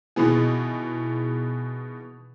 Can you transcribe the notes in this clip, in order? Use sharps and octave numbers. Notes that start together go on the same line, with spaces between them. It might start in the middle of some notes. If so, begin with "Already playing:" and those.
B2 D#3 E3 B3 G#4